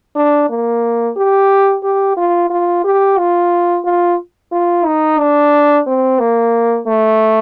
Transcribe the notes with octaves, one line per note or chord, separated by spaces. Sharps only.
D4
A#3
G4
G4
F4
F4
G4
F4
F4
F4
D#4
D4
C4
A#3
A3